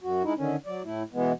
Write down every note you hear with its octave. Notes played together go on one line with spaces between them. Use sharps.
F#2 F#4
G#3 D#4 E4
D3 D#3 C#4
F#3 D5
A2 A3 E4
B2 E3 G#3 B3